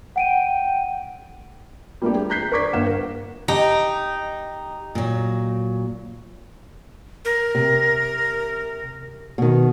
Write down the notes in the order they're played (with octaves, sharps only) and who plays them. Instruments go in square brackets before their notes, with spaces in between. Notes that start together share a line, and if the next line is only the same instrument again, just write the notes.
[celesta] F#5 D7 D#7 [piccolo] G5
[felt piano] G3 A3 A#3 D4 F4 G4
G4 G#4
A#5 F#6 G6 B6 C7
A#4 D5 C#6 D6 G#6 B6
G1 A#3 F5 F#5 E7
A#4
[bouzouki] D#4 [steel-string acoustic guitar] G4
[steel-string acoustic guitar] A#2 F#3
[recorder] A#4
[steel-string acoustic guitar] C3
B2 D#3